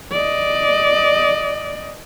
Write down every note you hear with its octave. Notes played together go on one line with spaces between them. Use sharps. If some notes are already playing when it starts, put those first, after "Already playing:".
D5 D#5